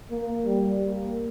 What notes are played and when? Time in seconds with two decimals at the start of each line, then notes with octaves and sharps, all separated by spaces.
0.11 A#3
0.45 G3
0.84 A#3